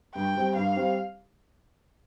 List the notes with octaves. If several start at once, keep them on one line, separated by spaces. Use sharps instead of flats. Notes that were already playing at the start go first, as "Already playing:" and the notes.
G2 G5
G3 C4 G4
G2 F5
G3 C4 G4